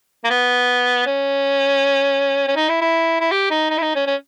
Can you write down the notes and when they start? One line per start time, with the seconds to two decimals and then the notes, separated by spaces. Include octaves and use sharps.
0.24 A#3
0.30 B3
1.06 C#4
2.48 C#4
2.56 D#4
2.69 E4
2.81 E4
3.21 E4
3.31 G4
3.50 D#4
3.70 D#4
3.78 E4
3.82 D#4
3.95 C#4
4.07 C#4